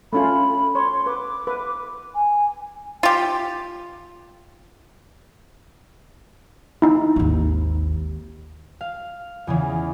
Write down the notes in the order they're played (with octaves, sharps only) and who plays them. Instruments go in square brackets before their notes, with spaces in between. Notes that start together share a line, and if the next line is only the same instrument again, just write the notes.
[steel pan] A3 C#4 F4 [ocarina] B5
[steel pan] C#5 [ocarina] C6
[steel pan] B4 [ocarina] D6
[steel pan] B4
[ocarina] G#5
[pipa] F4 G4
[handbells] D#4 E4
[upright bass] G#1 D#2
[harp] F5
E2 C#3 E3